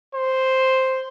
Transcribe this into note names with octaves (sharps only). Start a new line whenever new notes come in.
C5